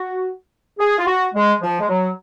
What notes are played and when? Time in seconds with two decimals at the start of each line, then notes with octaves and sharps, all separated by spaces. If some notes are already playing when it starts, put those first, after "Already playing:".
Already playing: F#4
0.79 G#4
0.97 F4
1.06 F#4
1.34 G#3
1.61 F3
1.80 G#3
1.88 F#3